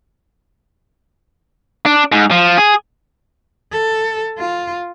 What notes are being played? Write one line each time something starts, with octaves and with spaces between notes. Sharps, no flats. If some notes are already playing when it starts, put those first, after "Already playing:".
D4
G#2
F3
G#4
A4
F4